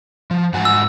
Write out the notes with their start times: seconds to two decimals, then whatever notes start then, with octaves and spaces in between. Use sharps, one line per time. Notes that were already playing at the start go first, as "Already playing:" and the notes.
0.31 F3
0.53 G#2 F#4 G#5
0.65 E6